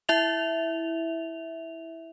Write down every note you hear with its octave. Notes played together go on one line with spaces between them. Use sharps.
E4 E5 F7